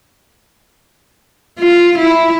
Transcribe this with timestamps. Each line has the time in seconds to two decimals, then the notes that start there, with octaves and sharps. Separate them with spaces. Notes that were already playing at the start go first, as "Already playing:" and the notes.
1.59 F4
1.98 E4